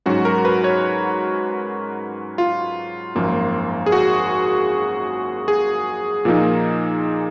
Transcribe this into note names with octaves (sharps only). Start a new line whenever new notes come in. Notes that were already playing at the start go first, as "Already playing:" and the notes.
G#2 F#3 C#4 F#4
A#4
B4
C#5
F4
G#1 F#2 F3 A#3
G#4
F#4
G#4
A#2 F3 A#3 D#4